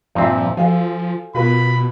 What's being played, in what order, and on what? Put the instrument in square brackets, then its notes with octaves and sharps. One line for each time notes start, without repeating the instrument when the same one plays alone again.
[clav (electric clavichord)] G2 A#2 C4 [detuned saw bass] F3 [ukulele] D#4 E5
[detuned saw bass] F3 [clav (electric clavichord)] F#4 [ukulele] A4 F5 G#5
[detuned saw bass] B2 [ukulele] F4 A#4 B4 [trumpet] B5